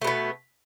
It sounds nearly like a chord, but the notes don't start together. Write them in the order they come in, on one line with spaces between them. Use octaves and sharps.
A3 B2 B3